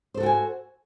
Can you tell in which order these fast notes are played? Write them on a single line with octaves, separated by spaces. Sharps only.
C5 A4 F#4 G5 G#5